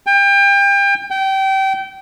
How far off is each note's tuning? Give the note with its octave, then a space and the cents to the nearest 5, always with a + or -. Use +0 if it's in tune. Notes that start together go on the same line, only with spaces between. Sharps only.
G5 +30
G5 -25